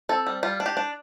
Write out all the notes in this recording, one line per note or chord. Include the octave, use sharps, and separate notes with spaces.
C4 A4
G3
G3 F4
D4
G4
D4